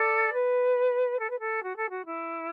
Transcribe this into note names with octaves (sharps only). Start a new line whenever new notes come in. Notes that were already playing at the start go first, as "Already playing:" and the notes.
Already playing: A4 D5
B4
A4
B4
A4
F#4
A4
F#4
E4